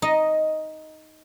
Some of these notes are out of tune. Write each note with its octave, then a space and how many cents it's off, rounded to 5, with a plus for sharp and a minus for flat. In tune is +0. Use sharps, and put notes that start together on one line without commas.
D#4 +5 D#5 +0